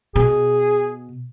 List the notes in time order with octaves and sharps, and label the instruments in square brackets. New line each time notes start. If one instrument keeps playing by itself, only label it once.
[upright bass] B2 [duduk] G#4